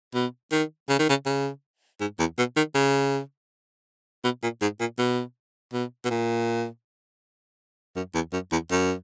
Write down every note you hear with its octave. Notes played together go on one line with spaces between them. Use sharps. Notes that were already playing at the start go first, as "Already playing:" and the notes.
B2
D#3
C#3
D#3
C#3
C#3
G#2
E2
B2
D#3
C#3
B2
A#2
G#2
A#2
B2
B2
B2
A#2
F#2
E2
F#2
E2
F#2